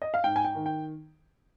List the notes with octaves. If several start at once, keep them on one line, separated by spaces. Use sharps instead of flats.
D#5
F5
G#2 G5
G#5
G5
D#3
G5